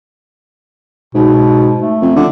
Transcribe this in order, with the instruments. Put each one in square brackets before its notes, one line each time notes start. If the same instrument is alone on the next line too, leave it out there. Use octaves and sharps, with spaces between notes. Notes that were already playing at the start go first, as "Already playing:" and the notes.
[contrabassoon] G#2 [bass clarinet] B2
[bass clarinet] A3
[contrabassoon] F2
D3